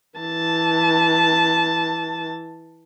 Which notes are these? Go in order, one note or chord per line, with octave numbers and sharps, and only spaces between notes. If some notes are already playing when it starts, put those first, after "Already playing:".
E3 A5